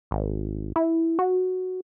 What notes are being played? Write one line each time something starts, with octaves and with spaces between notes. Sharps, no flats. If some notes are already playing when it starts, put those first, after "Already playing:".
G#1
E4
F#4